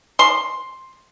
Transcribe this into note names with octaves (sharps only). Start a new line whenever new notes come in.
C6